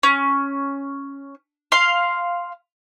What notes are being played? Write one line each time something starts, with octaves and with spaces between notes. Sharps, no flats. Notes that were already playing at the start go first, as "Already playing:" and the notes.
C#4
F5 C6